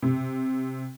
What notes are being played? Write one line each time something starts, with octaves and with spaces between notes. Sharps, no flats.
C3